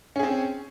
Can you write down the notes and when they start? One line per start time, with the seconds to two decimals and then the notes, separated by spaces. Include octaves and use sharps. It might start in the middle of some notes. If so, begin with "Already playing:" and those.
0.16 C#4
0.19 G#4
0.23 C4